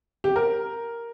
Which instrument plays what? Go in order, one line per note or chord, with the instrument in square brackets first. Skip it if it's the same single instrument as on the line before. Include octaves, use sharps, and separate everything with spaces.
[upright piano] G4
A#4